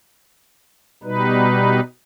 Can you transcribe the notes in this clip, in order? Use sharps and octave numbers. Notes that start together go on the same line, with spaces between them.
B2 G3 D#4 B4